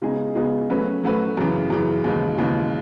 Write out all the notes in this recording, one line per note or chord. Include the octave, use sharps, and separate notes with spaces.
C#3 G#3 B3 D#4 G#4
C#3 G#3 B3 D#4 G#4
F#3 A3 C#4 F#4 B4
F#3 A3 C#4 F#4 B4
F#2 C#3 E3
F#2 C#3 E3
D#2 C#3 E3 G#3
D#2 C#3 E3 G#3